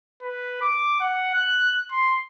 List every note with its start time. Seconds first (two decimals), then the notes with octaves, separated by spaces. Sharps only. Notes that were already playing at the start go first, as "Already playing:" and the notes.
0.22 B4
0.62 D6
1.00 F#5
1.34 F#6
1.92 C6